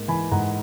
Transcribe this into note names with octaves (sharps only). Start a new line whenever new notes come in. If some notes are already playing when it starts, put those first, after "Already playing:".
Already playing: G#2 A#3
E3 G#5 B5
G#2 F#5 A#5